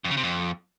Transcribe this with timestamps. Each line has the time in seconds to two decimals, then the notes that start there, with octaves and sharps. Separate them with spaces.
0.04 F2
0.11 C#3
0.17 C3
0.23 F2